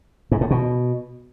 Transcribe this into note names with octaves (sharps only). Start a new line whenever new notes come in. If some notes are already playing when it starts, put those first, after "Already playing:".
G#2
A2
B2